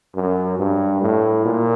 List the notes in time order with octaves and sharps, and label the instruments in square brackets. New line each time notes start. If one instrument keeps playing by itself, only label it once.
[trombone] F#2
G2
A2
A#2